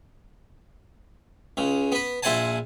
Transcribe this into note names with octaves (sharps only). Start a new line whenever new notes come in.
C#2 C#3
B3 B4
A#1 E4 C5 F#5 G#5 A5